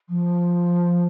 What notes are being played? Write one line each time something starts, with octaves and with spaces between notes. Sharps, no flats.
F3